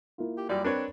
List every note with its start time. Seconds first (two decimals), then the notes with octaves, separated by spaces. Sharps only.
0.18 A#3 E4 F4
0.37 G4
0.49 F#2 G3 D5
0.64 C4 D4 A#4 B4 C#5